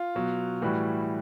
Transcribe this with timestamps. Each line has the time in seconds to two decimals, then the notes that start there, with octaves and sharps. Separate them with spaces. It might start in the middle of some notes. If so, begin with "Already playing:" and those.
Already playing: F4
0.15 B2 F#3
0.62 A2 E3 G3 F#4